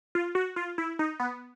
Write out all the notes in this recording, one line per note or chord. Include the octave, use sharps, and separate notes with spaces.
F4
F#4
F4
E4
D#4
B3